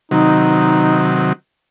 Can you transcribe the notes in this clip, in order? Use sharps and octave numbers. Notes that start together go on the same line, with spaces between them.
C3 D#3 F#3 D#4